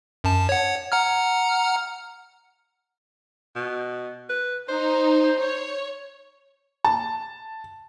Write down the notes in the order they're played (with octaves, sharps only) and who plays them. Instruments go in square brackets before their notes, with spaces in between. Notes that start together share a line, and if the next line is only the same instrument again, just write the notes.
[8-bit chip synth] F#2 A5
C#5 F#5
F#5 A#5 F6
[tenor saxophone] B2
B4
[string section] D#4 [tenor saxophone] C5
[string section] C#5
[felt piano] A5